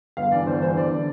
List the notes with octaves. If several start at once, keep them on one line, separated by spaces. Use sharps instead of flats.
G1 F5
G2 E3 D5
G1 C5
G2 E3 C5
G1 D5
D3